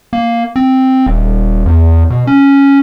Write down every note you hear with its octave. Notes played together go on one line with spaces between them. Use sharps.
A#3
C4
D#1
E2
B2
C#4